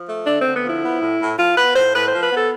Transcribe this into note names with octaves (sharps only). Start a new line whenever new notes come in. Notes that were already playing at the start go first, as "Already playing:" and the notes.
Already playing: F3
A3
D3 D4
D3 C4
B3
F3 E4
B3
A2
A2
F3 F4
B3 B4
A2 C5
A2 B4
C5
F3
B4
B3 A4